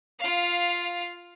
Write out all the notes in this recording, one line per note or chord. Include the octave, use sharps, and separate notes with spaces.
F4 F5